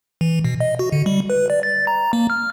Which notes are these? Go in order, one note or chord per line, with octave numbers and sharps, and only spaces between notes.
E3
B2
D#5
F#4
D3
G3
B4
D5
A6
A#5
A#3
F6